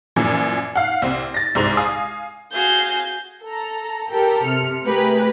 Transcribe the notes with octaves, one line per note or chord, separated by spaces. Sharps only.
F#2 A#2 E3 F3
F5 F#5
C2 C4
A6 A#6
C2 G#2 C5 F7
F5 G#5 D#6
F#4 G#4 F5 G6
A4 A#5
G4 A4 A#4 G5
C3 F6 C#7
A3 G4 G#4 A#4 B4